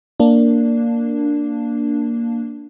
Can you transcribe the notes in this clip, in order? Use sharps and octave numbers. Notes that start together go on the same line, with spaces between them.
A#3 D4